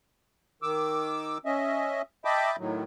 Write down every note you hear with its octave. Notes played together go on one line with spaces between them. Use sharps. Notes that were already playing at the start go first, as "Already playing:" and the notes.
D#3 D6 E6
C#4 D#5 E5
D#5 E5 G5 A5 B5 D6
A2 D#3 F#3